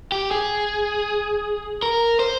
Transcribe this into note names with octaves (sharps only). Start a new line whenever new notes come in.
G4
G#4
A#4
C5